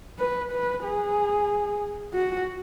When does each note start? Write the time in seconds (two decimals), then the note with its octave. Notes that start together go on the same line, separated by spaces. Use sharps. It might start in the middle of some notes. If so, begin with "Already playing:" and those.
0.19 B4
0.52 B4
0.84 G#4
2.14 F#4